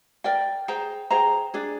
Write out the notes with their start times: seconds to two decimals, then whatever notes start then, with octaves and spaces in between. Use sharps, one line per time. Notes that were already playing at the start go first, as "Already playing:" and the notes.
0.24 A#4 D5 G5
0.68 G#4 C5 G5 A#5
1.10 G#4 C5 G5 A#5
1.54 D4 G#4 D5